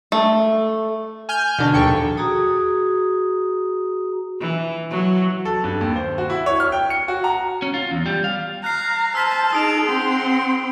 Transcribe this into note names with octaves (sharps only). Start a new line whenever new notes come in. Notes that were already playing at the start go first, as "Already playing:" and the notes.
A3
G#5 F6 G6
B2 D3 D4
A#1 D#2 A4 G5 C#6
F#4 G#4 A#5 D#6
E3
F#3
A4
G2
D#2
C5
F#4
E4
C#5
F6
G5
C#7
F#4
A#5
C#4
F4
E2
G3
F5
A#5 F6 F#6 C7
C5 G#5 A5 E6 B6
D#4 G#4 D#6 D7 F7
C4 F#5 C6